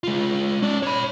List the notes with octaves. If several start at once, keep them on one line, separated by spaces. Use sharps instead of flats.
G#3 F4
C#4 D5
C#5 B5